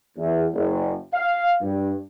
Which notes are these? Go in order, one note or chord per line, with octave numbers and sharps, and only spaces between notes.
E2
F#1
F5
G2